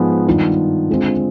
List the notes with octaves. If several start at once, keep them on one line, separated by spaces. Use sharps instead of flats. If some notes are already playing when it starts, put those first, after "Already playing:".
Already playing: G#2 F3 G#3 B3 F4
G2 D#3 B3 D4 F4
D3 G#3 C4 F4